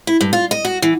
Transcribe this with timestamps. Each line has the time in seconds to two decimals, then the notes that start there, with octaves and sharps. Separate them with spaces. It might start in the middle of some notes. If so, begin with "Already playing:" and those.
0.07 E4
0.21 G2
0.33 F4
0.51 D#5
0.65 F#4
0.82 E3